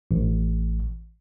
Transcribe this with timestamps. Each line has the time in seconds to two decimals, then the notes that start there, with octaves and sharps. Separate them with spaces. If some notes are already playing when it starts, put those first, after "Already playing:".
0.11 A1